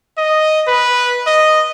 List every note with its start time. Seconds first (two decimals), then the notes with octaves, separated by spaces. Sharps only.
0.18 D#5
0.68 B4
1.27 D#5